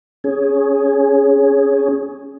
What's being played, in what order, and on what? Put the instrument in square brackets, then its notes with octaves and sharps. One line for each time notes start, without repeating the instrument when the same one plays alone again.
[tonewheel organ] C#4 G#4